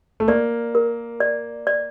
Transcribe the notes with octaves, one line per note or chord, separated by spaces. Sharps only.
A3
A#3 D5
A#4
D5
D5